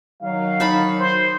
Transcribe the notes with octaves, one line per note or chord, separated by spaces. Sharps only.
D#3 F#3 F5
D#4 A5 B5
C5